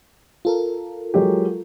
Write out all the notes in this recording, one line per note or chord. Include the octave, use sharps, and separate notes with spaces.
F4 A4 A#4
F#3 G#3 G4